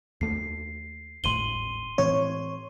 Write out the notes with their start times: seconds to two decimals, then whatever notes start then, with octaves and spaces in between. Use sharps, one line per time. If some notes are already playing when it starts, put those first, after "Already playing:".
0.21 D#2 A3 C7
1.24 D#1 G#1 A2 C6 D#7 G7
1.98 A2 E3 C4 C#5